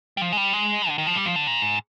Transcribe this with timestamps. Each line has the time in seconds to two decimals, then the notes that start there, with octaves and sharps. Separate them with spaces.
0.17 G3
0.21 F3
0.32 G#3
0.37 G3
0.53 G#3
0.89 D3
0.98 D#3
1.07 F3
1.16 G3
1.26 F3
1.36 D3
1.47 A#2
1.62 G#2